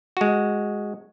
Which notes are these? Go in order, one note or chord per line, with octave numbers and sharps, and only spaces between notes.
G#3 F#4